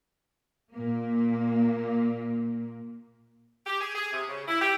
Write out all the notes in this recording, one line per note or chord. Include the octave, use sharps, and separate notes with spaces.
A#2 A#3
G4
G#4
G#4
C3
C#3
E4
G4